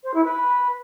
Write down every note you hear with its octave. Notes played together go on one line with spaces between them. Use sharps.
C5
E4
B4